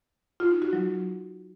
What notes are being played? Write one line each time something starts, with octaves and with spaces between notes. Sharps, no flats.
F4
D#4
F#4
F#3